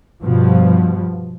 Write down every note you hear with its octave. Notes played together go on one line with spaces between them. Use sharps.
G2 B2 F3